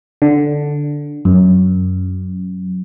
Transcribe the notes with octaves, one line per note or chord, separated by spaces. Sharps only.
D3
F#2